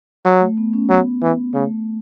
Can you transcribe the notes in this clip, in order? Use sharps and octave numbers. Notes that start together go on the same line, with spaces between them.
F#3
A3
B3
C#4
F#3 B3
E3
C#3 A3